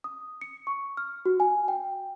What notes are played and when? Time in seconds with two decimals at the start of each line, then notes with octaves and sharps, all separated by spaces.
0.04 D#6
0.41 C#7
0.67 C#6
0.97 F6
1.25 F#4
1.40 G#5
1.68 G5